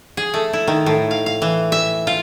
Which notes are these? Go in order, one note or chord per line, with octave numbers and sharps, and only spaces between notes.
G#4
A3
E4
D#3
A2
F5
F5
E3
E5
F4